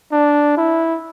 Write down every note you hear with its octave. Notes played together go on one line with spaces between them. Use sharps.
D4
E4